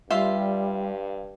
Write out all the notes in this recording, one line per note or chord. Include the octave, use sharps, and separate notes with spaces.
G2 G3 F4 E5 C6